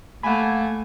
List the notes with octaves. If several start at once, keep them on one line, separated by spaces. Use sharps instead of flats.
A3 A#3 F#5 G#5 B5